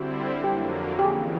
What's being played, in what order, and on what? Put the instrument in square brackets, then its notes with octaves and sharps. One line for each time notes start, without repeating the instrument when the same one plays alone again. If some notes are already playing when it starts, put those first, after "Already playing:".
Already playing: [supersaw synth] D3 G3 C4 E4 [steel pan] F#4
[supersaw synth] F2 D3 F#3 A#3 [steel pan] G4
[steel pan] G4
[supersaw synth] F2 C#3 E3 [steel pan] G#4